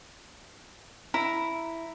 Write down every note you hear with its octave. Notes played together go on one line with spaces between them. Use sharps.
E4 A#5